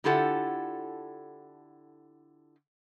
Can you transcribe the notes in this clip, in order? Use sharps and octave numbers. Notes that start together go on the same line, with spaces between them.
D3 E4 F4 G4 A4 F#5